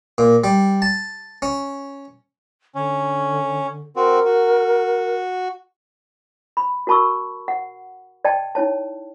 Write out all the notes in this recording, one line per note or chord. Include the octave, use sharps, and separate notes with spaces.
A#2
G3
A5
C#4
D3 C#4
C4 F#4 A#4
F#4
B5
F#4 A#4 A5 B5 C#6 E6
F#5
D5 D#5 G5 A5
D#4 E4 C#5 A5